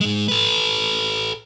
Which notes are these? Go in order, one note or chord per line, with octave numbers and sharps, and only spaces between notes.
G#2 G#3
A4 B4